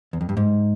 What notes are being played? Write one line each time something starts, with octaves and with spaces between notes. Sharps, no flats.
E2
F2
G2
G#2